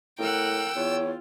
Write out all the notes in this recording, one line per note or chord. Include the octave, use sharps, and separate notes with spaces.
A2 A#4 F#5 G5 E6
E2 F4 C#5